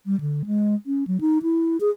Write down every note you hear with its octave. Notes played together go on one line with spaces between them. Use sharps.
G3
D3
G#3
C#4
F#3
D#4
E4
G#4